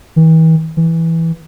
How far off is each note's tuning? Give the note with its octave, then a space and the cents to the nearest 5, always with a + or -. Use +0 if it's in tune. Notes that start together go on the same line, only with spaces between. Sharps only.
E3 -40
E3 -5